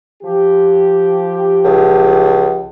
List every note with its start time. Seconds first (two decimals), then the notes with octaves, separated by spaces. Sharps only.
0.23 F3 G4
1.64 C#2